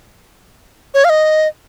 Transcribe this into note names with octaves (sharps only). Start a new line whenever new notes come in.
C#5
F5
D#5